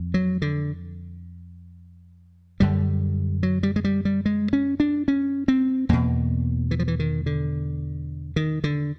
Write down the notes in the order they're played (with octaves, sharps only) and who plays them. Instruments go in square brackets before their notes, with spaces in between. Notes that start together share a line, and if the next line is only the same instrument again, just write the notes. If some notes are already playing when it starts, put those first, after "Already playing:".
Already playing: [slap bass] F2
F#3
D3
F#2 D3 G3
F#3
G3
G#3
G3
G3
G#3
C#4
D4
C#4
C4
E2 B2 A#3
E3
F3
E3
D#3
D3
D#3
D3